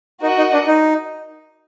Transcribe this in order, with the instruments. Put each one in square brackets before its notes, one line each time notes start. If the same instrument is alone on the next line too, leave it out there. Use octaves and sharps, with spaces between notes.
[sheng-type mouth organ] D#4 [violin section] F#4 A#4 D#5 F#5
[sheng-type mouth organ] D#4
D4
D#4